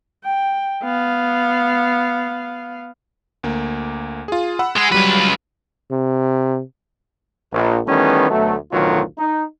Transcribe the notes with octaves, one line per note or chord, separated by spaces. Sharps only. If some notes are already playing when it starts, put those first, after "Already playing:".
G5
B3 F5
D2 A#3
F4 G#4
F#5 B5 E6
G#3 G#4
C#2 F#3 G3 B4
C3
A#1
D#3 E3 G3 A3 B3 C#4
D2 B2 F#3 A3
A1 D2 B2 D#3 F#3 F4
D#4